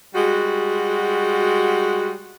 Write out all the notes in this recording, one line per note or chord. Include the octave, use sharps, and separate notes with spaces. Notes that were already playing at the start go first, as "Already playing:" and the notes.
G3 G#3 F#4